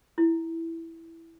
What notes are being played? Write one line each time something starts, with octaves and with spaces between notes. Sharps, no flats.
E4